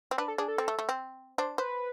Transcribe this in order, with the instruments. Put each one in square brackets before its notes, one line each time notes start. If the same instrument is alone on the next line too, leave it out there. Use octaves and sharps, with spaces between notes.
[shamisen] C4
[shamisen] D4 [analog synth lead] B4
[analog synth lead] A4
[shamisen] D4 [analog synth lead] G#4
[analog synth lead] A4
[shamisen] C4
A3
A3
C4
[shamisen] D4 [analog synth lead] C5
[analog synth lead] B4 [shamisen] C5